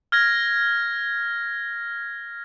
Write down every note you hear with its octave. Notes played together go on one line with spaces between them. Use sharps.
F6 G#6 A#6